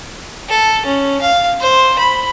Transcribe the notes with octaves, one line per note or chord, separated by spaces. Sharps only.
A4
C#4
F5
C5
B5